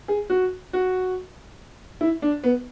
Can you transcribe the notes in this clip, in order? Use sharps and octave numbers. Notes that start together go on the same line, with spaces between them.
G#4
F#4
F#4
E4
D4
B3